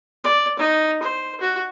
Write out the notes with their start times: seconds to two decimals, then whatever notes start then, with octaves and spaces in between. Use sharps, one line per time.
0.24 D5
0.59 D#4
1.02 C5
1.40 F#4